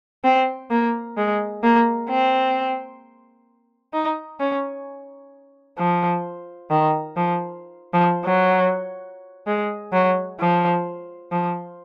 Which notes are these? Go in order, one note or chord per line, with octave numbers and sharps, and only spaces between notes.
C4
A#3
G#3
A#3
C4
D#4
C#4
F3
D#3
F3
F3
F#3
G#3
F#3
F3
F3